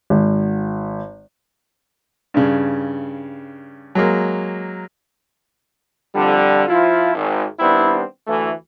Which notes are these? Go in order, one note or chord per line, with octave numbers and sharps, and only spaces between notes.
G#1
G2 C#3
F#3 G#3 A#3
F2 D3 G3
F3 E4 F4
G#1
D#3 G3 B3 C4 D4 E4
D2 E3 A3